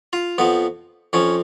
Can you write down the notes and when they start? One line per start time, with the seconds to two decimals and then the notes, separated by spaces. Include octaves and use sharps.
0.13 F4
0.38 F2 F3 B3
1.13 F2 F3 C#4